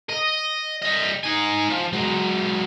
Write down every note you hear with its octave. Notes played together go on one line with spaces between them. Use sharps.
D#5
G3 D#5
D#4 G#5
F3
F#3 G#3